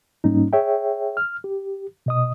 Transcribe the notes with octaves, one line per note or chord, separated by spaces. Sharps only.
G#2 G3 A#3 C#4 D#4
G#4 C#5 E5 G5
F6
G4
B2 D#5 D#6